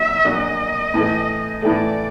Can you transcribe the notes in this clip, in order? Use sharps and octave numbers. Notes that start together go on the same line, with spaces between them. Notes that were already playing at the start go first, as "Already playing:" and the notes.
Already playing: A#2 F#3 A#3 D4 E5
A#2 F#3 A#3 D4 F#4 D#5
A2 E3 A3
A2 E3 A3 D5